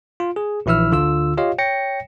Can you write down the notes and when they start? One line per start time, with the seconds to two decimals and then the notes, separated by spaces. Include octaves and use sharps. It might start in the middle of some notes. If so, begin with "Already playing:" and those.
0.20 F4
0.36 G#4
0.66 A#1 E3 E4 E5 E6 F6
0.91 D2 D3 F4 E6
1.38 F4 G4 C#5 D#5 F5
1.58 C#5 G5 A#6 C#7